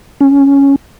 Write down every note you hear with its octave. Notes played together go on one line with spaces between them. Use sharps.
C#4